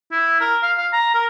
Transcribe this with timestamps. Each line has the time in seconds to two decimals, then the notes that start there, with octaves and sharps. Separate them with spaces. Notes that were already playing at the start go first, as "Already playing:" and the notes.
0.12 E4
0.41 A#4
0.63 F5
0.77 F5
0.93 A#5
1.15 A#4